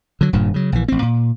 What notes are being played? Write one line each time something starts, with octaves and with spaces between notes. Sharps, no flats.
D3 F#3
D#1 G2 A#2
C#3 F#3
A#1 E3
A1 C4
A#2